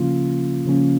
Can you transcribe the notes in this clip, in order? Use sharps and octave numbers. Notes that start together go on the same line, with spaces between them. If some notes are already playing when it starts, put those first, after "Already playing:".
Already playing: C#3 F3 A#3 C#4 F4
C#3 F3 A#3 C#4